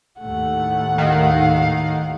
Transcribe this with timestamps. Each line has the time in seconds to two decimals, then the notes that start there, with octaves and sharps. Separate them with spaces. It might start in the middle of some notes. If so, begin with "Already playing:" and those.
0.20 D#2 A2 A3 F#5
0.98 D#3 F5